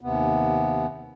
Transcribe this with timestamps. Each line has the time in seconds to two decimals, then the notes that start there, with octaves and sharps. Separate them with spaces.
0.01 D#2 C3 B3